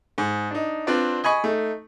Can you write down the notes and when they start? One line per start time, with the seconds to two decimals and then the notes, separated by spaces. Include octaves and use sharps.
0.18 G#2
0.51 D4 D#4
0.87 C4 D4 F4 B4 D5
1.24 D#5 G#5 B5 C#6
1.44 A3 D#4